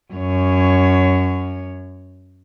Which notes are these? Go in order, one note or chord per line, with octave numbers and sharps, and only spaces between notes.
F#2 C#5